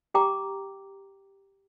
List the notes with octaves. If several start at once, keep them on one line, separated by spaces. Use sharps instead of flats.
G4 G5 A#5 D6